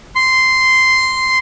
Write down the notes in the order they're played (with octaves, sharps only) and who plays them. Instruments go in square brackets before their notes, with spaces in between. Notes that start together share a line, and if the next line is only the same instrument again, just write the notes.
[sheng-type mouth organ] C6